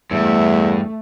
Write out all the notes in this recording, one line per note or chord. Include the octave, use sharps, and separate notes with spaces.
E2 G2 A3 E5